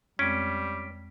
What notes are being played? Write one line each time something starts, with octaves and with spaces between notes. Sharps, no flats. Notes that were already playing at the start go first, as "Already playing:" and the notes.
F2 G3 G#3 C4 C#4 B6 D7